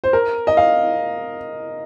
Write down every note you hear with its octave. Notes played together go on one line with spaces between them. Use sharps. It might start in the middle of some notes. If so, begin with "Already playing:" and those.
C5
A#4
D#5
F5